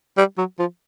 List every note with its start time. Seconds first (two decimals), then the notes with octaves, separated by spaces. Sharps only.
0.18 G3
0.38 F#3
0.59 F3